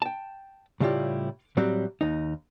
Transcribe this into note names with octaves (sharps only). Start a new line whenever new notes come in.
G5 A5
A2 C#3 G3 E4 F4 G4
A2 F#3 G3 C4 F#4
D#2 D#4